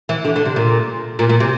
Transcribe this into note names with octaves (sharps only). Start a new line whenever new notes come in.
E3
D3
D3
C3
A#2
A#2
A#2
C3